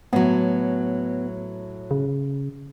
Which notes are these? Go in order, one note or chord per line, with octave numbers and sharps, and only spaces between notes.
A2 F#3 B3
C#3